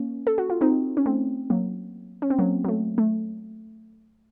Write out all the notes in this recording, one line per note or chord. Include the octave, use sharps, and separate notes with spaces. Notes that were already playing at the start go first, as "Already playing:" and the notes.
Already playing: A#3 C#4
A4
F#4
F4
C4 D#4
C#4
A3 C4
F#3 A#3
C#4
C4
F#3 A#3
F#3
A3
A3